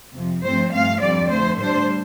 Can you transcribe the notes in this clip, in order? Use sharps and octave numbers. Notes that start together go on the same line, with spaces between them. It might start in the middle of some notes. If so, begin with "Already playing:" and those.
F2 C3 F3
G2 F3 A3 C4 C5
G2 F3 A3 C4 F5
F2 D3 G3 C4 D5
F2 D3 A3 C5
A2 G3 D4 C5